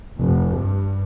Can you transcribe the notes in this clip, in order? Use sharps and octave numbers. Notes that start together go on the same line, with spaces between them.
F1
G2